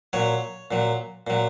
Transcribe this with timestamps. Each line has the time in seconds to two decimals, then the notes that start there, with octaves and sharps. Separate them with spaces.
0.13 A#2 F#3 C#5
0.71 A#2 F#3
1.27 A#2 F#3